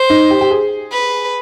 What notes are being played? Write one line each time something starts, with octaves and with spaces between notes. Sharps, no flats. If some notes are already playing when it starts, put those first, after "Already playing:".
Already playing: C5
D#4
G4
G4
G#4
B4